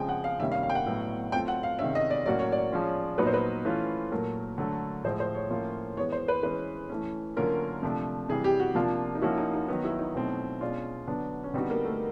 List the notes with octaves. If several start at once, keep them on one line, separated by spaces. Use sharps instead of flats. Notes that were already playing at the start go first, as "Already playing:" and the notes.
Already playing: C#3 F3 G#3 C4 G5 G#5
F#5
F5
C3 D#3 G3 A#3 C#4 E5
F5
F5
G5
F#5
A2 F#3 B3
F#3 A3 C4 F4 G5
F#5
F5
C3 D#3 G#3 C#4 E5
D#5
D5
A2 F#3 A#3 C#4 F#4 D5
C#5
D5
F3 G#3 C#4 F4
A#2 F#3 B3 D#4 F#4 B4
C5
B4
E3 A3 C#4 F4
A#2 F#3 A3 A#4
D3 F#3 A3
A2 F3 G#3 C5
C5
C#5
A2 F3 A#3 C#4 F4
E3 G#3 B3 C#5
C5
B4
E3 G#3 C#4 B4
E3 A3 C#4
D3 F#3 A#3 C#4 F4 A#4
C3 F3 A3 D4
C3 E3 G3 G#4
G4
F#4
C3 F3 A#3 D4 F4
D#4
F3 A#3 C#4 E4 F#4
D#4
D#4
D#3 F#3 B3 D#4
E4
D#4
B2 F#3 A3 C4
B2 G#3 C#4 D4 F4
D3 F#3 B3 D4
C#4
D3 G3 B3 C4 D#4 F#4
A#3
A3